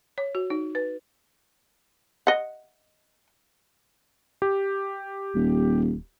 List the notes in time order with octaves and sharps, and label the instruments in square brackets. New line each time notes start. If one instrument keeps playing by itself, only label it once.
[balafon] C#5
F#4
D#4
B4
[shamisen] D#5 F#5
[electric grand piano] G4
[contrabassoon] D#1